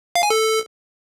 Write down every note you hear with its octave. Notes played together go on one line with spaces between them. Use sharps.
F5
G#5
A4